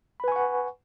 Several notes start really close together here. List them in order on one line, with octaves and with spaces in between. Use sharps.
B5 B4 G#5 C#6 F#5